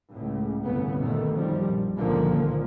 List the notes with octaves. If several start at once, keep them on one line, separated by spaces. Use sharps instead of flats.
C#2 A2
G1 C2 A2 C#3 E3 B3
B2 D#3 A3
F#2 D#3 F3 G3
A#1
C#2 A#2 D3 D#3 F3 A#3